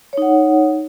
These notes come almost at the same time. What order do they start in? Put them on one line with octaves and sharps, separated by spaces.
C#5 D#4 F#5